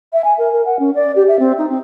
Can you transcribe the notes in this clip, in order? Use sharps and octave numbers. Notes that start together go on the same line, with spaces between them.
E5
G#5
A#4
A#4
F#5
C#4
D5
G4
E5
C4
D#4
C4